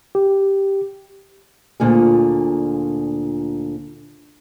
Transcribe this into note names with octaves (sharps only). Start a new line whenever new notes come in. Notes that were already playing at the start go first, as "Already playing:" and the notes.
G4
D2 A#2 D3 F4 G#4